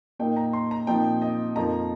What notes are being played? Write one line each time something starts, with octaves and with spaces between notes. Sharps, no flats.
A#2 A#3 D#4 G5
A#5
C6
A#5
A#2 F3 C4 D#4 G5
D#5
F2 F3 A#3 D#4 A#5